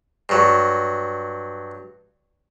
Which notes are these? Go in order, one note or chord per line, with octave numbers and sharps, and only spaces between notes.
G2 F#3